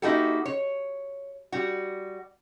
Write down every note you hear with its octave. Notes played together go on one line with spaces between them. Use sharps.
A#3 D#4 E4 F#4 G4 A4
C#5
G3 F#4